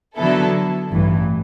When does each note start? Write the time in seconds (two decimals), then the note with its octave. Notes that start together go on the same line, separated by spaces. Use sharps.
0.17 D3 F#3 B3 E4 A4
0.91 A1 G2 E3